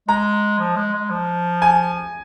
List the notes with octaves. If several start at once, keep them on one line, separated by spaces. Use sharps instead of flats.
G#3 A#5
F3
G#3
G#3
F3
G#5